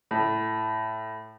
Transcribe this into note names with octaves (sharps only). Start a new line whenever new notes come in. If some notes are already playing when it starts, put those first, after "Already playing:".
A2